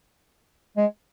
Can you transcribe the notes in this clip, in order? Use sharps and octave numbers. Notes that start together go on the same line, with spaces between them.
G#3